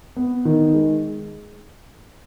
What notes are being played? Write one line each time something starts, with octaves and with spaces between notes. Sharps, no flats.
B3
D#3
G#3